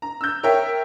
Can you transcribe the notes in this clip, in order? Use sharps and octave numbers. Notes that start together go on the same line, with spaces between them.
A#5
E6 G6
A#4 C#5 E5 G5